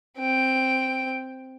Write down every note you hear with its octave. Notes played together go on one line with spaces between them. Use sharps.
C4 G5